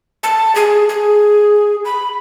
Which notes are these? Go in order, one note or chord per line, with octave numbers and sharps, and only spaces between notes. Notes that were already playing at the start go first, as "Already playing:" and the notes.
A5
G#4
G#4
B5